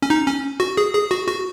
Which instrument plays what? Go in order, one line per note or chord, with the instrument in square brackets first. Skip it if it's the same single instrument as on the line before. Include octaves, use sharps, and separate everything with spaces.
[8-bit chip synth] C#4
D#4
C#4
F#4
G#4
G#4
F#4
F#4